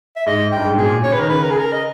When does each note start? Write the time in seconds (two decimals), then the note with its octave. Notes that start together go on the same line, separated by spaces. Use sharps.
0.16 E5
0.26 G#2 D#5
0.52 G2 G5
0.65 G#2
0.76 B2 G#4
0.85 A#2
1.04 C#3 C#5
1.13 B4
1.17 D#3 A#4
1.29 C#3 B4
1.43 A#4
1.51 G#4
1.58 A#4
1.72 D#5